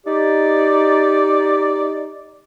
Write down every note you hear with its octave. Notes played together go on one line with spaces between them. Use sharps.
D#4 G4 D5